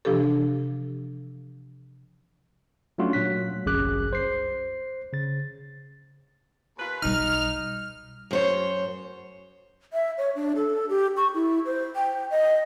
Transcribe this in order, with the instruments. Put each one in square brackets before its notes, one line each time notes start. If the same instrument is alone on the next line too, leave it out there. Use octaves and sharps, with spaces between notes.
[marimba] C3 E3 F3 D4 G4 A4
[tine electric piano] F#3 A3 C#4 D4 F4 F#4
A#2 F#3 F#6 B6
G1 C2 F#2 G#4 D6 F#6
C5 C7
C#3 A6
[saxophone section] D#2 F4 B4
[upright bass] B1 G3 [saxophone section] D#4 [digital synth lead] F6
[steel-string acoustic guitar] F#2 C5 C#5
[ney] E5
C#5
D4
A4
G4
C#6
E4
C5
G5
D#5